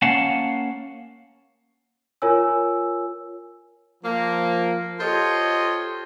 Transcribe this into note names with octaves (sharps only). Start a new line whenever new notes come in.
A#3 C#4 F5 F#5 A5
F4 A#4 C#5 G#5 E6
F3 A#3
F4 G4 A4 C5 C#5 D#5